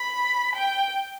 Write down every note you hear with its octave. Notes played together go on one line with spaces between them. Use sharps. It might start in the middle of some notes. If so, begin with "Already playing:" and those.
Already playing: B5
G5